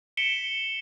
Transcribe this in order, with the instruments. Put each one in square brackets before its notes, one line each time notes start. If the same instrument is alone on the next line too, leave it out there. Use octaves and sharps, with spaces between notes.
[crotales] B6 C#7 D7 E7 G7